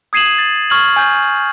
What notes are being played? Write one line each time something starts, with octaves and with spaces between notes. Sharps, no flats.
D#6 G#6 C7 D#7 E7 F#7
A6
C#6 F6 G#6 F#7
G#5 G6